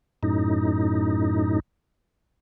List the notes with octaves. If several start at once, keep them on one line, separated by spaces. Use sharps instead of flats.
F#2 A2 D#4